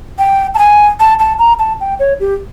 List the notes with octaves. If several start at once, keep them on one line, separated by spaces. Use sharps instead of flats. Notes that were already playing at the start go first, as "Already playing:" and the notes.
G5
A5
G#5
A5
A5
A#5
A5
G5
C#5
G4